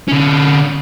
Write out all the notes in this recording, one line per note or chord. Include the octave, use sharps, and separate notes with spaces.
D3 C#4